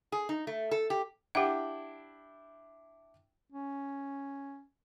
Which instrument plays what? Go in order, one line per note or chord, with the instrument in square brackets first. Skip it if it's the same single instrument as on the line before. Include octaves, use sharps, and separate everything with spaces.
[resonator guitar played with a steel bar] G#4
D#4
A3
A4
G4
[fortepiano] D4 E4 G5 [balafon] G4 F#5
[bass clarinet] C#4